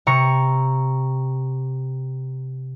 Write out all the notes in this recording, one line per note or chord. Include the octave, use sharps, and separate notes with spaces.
C3 A#5 C#6 C#7